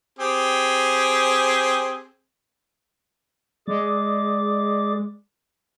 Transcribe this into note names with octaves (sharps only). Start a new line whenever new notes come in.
C4 G4 G#4
G#3 G#4 D5 D6